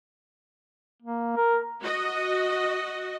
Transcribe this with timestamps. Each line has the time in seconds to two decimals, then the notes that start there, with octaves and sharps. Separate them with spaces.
1.02 A#3
1.37 A#4
1.82 F#4 D#5